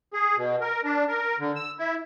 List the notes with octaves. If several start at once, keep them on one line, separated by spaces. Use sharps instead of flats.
G#4
B2
A#4
D4
A#4
D3
E6
E4